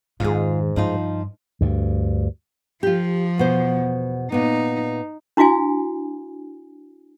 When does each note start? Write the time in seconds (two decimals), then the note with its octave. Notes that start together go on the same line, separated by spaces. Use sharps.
0.20 F2 G#2 D#3 F4 G#4
0.76 G2 F3 D#4 F4
1.61 D2 G2
2.83 F3 F4 G4
3.38 E2 B2 C5
4.32 A#2 B3 D#4
5.37 D4 E4 F#4 F5 G#5